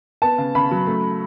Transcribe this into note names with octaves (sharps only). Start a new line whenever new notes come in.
B3 A5
C#3
C#3 B5
F#3
A3